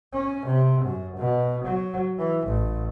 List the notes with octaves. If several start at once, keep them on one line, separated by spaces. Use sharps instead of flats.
C#4
C3
F#2
B2
F#3
E3
A1